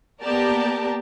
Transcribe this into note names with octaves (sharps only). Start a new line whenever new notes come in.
A#3 B3 G4 A#4 D5 A5